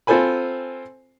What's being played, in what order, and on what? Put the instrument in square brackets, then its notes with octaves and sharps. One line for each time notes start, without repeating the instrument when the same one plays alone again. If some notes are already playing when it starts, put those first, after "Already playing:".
[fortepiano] C4 F4 A4 C5 G#5 B5